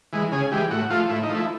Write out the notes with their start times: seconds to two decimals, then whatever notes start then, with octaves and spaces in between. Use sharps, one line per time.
0.13 E3 G#3
0.32 C#3 G#4
0.51 E3 G#3 G4
0.71 A2 F#4
0.90 F3 A3 F4
1.09 A2 E4
1.23 D#4
1.29 F3 A3
1.36 E4